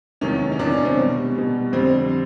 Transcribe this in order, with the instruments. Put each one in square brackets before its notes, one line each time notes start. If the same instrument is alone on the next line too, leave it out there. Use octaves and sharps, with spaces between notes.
[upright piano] E2 C3 D#3 F#3 C#4
C#4
E2 C3 D#3 F#3 D4
C#4
C4
B2 G3
B2 G3
F2 D3 G3 C4